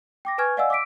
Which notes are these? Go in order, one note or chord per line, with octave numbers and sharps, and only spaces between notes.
G5 D6 A#6
B4 G#5 C#6 F6 G#6
D5 D#5 F5 F#5 G#5 E6
D6 E6 B6 D7